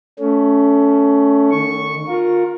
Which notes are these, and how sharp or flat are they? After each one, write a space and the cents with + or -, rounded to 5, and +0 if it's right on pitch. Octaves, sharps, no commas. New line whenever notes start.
A3 +0 C#4 +20
D#3 -35 C#6 -5
F4 +25 A#4 +0